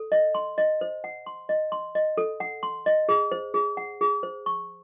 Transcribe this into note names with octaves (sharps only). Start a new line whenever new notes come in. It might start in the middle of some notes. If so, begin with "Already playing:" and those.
Already playing: A4
D#5
C6
D#5
C5
F#5
C6
D#5
C6
D#5
A4
F#5
C6
D#5
G#4
C5
G#4
F#5
G#4
C5
C#6